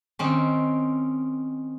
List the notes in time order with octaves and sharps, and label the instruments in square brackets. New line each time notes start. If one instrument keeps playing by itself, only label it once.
[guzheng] D#3 C4 C#4